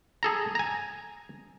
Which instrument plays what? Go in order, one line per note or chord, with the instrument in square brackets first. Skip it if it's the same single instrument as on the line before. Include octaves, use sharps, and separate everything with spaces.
[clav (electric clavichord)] G#4 A4 A#5
G#5 A#5